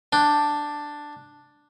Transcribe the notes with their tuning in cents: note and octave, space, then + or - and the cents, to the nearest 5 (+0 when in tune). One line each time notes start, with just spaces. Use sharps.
D4 +5 G5 +0